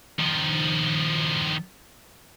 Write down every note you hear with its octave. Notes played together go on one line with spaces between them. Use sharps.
D#3 F3